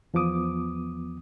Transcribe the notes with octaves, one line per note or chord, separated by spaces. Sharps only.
E2 F3 B3 D6 D#6